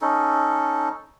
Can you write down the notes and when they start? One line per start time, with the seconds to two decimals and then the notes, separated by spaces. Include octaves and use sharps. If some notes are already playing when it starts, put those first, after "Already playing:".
0.02 C#4 D#4 A4